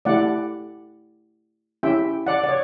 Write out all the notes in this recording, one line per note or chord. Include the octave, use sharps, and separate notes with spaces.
A3 E4 G4 D5 F#5
C#4 E4 G4 E5 G5
D5 F#5
D5
C#5